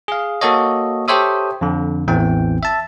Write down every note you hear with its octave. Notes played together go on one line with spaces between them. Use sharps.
G#4 F5
A#3 F#4 A4 C#5 D#5
G4 A4 C5 C#5 E5 D#6
F2 D3
A1 E2 E3 C4 G5
E5 A5